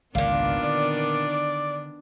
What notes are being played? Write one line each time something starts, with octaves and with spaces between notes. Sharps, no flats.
G#1 C#2 A#2 D3 D#3 B3 D4 F5
D3 D5